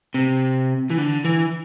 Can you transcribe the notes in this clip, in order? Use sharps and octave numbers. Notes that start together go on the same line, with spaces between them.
C3
E3
D3
E3